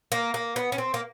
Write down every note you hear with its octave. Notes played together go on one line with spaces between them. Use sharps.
A#3
A#3
B3
C#4
C4
A#3